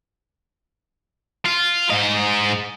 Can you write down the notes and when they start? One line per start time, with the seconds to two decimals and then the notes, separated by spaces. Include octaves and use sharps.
1.46 F4
1.90 G#2 D#5